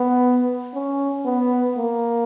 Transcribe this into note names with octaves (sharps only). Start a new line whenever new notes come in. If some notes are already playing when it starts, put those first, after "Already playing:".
Already playing: B3
C#4
B3
A#3